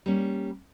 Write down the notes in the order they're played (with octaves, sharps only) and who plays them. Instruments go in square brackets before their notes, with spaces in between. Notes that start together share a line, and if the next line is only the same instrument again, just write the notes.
[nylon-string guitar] G3 A#3 C#4